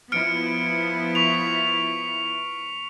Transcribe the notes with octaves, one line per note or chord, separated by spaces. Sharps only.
F3 B3 E4 F6 C#7 D7
C#6 B6 F7